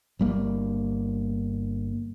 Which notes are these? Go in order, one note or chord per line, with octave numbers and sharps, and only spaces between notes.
G1 G3 A#3